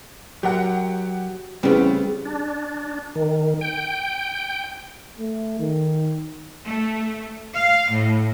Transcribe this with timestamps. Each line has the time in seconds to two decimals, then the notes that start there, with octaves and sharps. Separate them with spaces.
0.43 F#3 G4 A#4 F#5
1.63 A1 C#3 G3 B3 C4
2.26 D4
3.15 D#3
3.61 G5
5.18 A3
5.59 D#3
6.66 A3
7.54 F5
7.92 A2